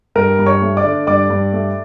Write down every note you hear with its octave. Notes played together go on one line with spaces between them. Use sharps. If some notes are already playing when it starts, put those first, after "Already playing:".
G2 A#4 A#5
G2
C#5 C#6
A3
D5 D6
D3
G2 D5 D6
G2
A3